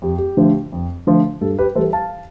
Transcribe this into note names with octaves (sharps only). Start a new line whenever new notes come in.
F2 G4
G4
D3 F3 A3
F2
D3 F3 A3
G2 A4
G4 B4
E3 G3 A4 C5
F5 A5